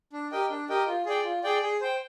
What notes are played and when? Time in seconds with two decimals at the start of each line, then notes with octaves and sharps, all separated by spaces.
0.13 D4
0.32 G4 A#4 D#5 G5
0.50 D4
0.69 G4 A#4 D#5 G5
0.87 F4
1.06 G#4 D5 G5
1.24 F4
1.44 G#4 D5 G5
1.62 G#4
1.81 C5 G5